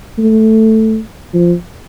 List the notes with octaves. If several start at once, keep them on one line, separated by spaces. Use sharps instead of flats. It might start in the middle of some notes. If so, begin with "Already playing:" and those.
A3
F3